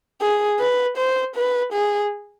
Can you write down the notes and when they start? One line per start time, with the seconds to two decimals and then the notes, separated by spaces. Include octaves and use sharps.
0.21 G#4
0.60 B4
0.98 C5
1.36 B4
1.73 G#4